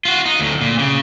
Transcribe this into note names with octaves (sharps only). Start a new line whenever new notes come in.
F4 F#4
D#4
D2 A2
A#2
C#3